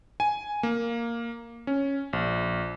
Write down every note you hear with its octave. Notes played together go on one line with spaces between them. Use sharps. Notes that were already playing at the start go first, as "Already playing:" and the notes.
G#5
A#3
C#4
A#1